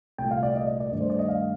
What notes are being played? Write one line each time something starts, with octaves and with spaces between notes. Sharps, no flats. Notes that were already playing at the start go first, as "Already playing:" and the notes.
C2 A#2 A3 G5
F5
D5
D#5
D#5
D5
G2 D#3 A3
C5
D5
D#5
F5